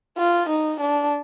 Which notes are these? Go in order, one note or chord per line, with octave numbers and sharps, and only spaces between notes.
F4
D#4
D4